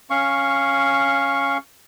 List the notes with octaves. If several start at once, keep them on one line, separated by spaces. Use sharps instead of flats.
C#4 F5 C#6